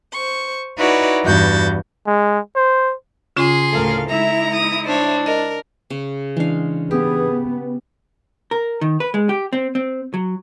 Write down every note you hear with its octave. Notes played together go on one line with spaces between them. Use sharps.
C5 C#6
D#4 E4 F#4 B4 C#5 D5
E2 G2 F#4 G6 A6
G#3
C5
C#3 C#4 F4 G#4 C6
D2 A2 A4 A#4 F5
G#3 D#4 E4 E5 A#5
D#6
D4 C5 C#5
A#4 D#5
C#3
E3 G#3 D4 F5
B3 G4 G#4
A#4
D#3
B4
G#3
G4
C4
C4
F#3